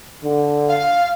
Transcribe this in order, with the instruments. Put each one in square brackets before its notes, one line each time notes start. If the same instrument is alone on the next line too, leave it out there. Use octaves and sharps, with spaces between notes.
[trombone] D3
[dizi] F5